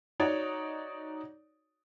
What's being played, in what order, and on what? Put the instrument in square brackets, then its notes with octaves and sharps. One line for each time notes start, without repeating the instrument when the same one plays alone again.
[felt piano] D#4 F#4 C#5 D5